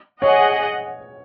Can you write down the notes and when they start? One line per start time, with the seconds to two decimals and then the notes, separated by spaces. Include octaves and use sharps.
0.22 G#4 C#5 D#5 F#5